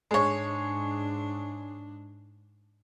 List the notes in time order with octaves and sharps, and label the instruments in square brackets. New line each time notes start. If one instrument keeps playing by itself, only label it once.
[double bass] G#2 D4 [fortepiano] G#3 C#5